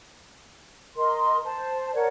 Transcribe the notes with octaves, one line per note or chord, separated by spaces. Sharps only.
A#4 D#5 C6
C5 A5
A#4 C#5 D5 F#5